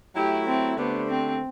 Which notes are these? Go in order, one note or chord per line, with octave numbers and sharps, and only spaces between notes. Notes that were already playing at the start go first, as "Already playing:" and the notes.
F#3 A3 E4 G4
C4
D3 A3 B3 D4 G4 C5
C4